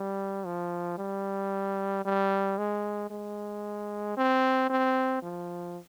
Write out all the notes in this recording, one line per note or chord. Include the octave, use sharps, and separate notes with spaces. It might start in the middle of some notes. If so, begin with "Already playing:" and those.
Already playing: G3
F3
G3
G3
G#3
G#3
C4
C4
F3